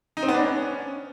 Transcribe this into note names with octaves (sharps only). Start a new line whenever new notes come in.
D#4
C4
B3
D4
C#4